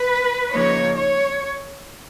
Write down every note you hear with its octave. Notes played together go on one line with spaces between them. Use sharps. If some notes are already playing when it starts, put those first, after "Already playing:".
Already playing: B4
C#3 F3 A#3 D#4 C#5
C#5